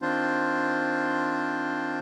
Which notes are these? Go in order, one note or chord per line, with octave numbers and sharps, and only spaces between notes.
D#3 C4 D4 F4 C5